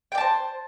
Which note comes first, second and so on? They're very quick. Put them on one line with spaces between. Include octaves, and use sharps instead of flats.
G5 D5 A5 C5